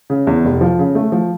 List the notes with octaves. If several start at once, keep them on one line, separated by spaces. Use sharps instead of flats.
C#3
E2
F1
F3
C#3
A3
F3